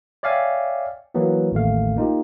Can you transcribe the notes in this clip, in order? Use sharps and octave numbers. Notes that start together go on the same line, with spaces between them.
C#5 D5 E5 F5 G5 G#5
E3 F#3 A#3 B3
A1 D#2 A3 F5
A#3 D#4 F4 G4